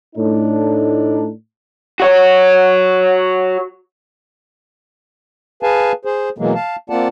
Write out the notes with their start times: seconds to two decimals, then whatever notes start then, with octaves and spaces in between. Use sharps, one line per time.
0.16 A2 D4 D#4
2.00 F#4 C#5
5.63 G#4 B4 F5 G#5 A5
6.05 G#4 C5
6.38 B2 E3 F#3 G#3 A#3
6.55 F5 A5
6.90 A#3 C4 F4 D5 F#5 A5